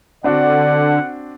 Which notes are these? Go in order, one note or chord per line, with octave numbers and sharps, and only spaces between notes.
D3 C4 D4 F#4 D5 F#5